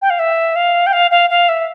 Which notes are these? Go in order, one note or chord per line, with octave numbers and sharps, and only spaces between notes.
G5
F5
E5
F5
G5
F5
F5
F5
E5